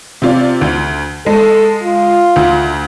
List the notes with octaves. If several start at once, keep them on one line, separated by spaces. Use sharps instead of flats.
C3 F4 D5
D2
G#3 A4
F4
D2